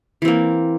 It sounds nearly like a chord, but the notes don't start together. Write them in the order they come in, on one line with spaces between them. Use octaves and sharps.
E3 C4 A#3